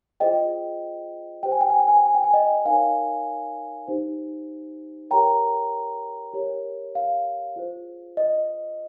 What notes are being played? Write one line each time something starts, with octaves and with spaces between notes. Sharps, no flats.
F4 G#4 C5 D#5 G5
G4 C5 G5
G#5
G5
G#5
G5
G#5
G5
G#5
G5
G#5
D#5 G5
D#4 A#4 C#5 F5 G#5
D#4 G4 C5
G4 A#4 C#5 G5 A#5
G4 A#4 C#5
F5
F4 G#4 C5
D#5